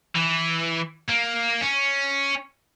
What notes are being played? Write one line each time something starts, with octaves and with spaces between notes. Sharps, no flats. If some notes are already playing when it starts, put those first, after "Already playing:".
E3
A#3
C#4